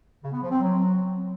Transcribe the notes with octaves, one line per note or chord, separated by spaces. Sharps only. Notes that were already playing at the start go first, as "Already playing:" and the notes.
C#3
B3
F3
C4
F#3